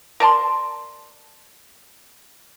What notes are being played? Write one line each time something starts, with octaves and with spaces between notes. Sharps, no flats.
A#4 D5 A5 C6